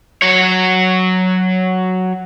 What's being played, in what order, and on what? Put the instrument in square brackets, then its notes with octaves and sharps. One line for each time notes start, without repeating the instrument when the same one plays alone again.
[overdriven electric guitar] F#3 C#5